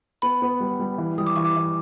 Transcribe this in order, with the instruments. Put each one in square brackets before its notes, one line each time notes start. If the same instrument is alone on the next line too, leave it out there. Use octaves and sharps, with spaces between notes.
[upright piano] B3 [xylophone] B5
[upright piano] B3
G3
G3
E3
[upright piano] G3 [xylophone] D#6
[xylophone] D6
[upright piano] E3 [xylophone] C#6
[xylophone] D6
[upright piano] E3